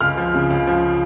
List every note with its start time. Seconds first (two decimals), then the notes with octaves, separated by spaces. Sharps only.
0.01 C#2 F6
0.17 F3
0.34 C#3
0.50 C#2
0.67 F3